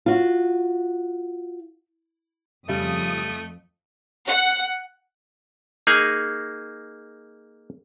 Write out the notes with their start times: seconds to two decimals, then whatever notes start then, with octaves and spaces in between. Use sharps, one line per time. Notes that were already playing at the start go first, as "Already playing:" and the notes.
0.06 F4 F#4
2.68 F2 C#3 G3 A3 D#6
4.28 F#5
5.87 A#3 D#4 G#4 G#5